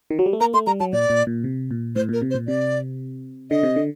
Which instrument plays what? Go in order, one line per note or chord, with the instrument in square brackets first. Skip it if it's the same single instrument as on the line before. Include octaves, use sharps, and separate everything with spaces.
[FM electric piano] D#3
F#3
G3
A3
[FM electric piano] A#3 [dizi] A#5
[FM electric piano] A3 [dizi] C6
[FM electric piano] G3 [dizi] A#5
[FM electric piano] F#3 [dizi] A5
[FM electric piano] A#2 [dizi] D5
[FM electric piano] A#2
A#2
C3
A#2
[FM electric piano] A2 [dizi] C5
[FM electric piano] A#2 [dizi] A#4
[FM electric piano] C3
[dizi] C5
[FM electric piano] A#2
[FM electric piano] C3 [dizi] D5
[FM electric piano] D3 [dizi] D#5
[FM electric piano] C3
D3